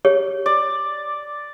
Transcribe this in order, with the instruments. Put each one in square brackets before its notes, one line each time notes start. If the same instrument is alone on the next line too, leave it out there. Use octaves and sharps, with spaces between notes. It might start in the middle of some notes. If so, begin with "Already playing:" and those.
[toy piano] G4 C#5
[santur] D5